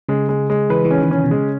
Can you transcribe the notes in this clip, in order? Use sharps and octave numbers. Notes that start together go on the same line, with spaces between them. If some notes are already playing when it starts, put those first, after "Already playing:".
C#3 G#3
G#3
G#3
E3 B4
E3
C#4
D#3
C#3 C#4
B2
C#3 G#3